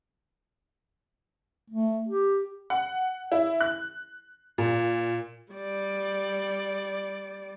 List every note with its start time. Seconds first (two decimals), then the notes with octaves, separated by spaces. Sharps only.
1.70 A3
2.09 G4
2.70 F#5
3.32 E4
3.61 F#6
4.58 A#2
5.52 G3 D5